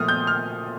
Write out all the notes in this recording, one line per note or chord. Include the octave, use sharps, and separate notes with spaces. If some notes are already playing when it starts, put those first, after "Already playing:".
Already playing: A#2 F3 A3 D#6 F6
G6
F6